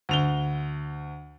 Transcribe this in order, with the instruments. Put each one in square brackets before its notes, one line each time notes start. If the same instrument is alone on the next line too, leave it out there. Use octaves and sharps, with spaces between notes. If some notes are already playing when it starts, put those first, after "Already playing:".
[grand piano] D2 F7 G7